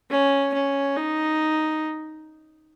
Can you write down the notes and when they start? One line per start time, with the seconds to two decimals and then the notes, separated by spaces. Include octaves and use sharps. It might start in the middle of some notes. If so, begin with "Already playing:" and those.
0.11 C#4
0.54 C#4
0.96 D#4